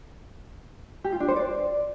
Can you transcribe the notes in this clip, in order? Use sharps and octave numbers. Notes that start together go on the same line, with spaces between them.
G4
F4
D4
C5
D5